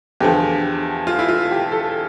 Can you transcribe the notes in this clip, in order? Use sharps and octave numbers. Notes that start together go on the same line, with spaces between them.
E2 D3 F3 G4
F4
E4
F4
G4
A4